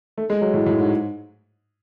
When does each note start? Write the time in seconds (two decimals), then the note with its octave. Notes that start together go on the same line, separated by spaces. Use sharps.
0.18 A3
0.30 G#3
0.42 F#3
0.54 A2
0.66 A2
0.78 G#2